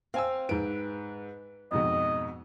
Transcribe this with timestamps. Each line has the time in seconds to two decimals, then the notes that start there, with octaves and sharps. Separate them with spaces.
0.14 C4 F5 G#5 E6
0.49 G#2 B4 D7
1.71 F2 G#2 B2 D#5